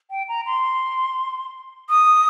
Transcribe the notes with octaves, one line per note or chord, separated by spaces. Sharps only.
G5
A#5
C6
D#6